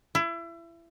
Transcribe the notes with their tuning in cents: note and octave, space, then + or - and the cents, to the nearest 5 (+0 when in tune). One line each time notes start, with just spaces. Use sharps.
E4 +30